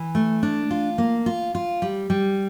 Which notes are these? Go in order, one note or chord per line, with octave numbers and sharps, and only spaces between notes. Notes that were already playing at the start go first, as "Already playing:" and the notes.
Already playing: E3
A3
D4
F4
A#3
F4
F4
G3
G3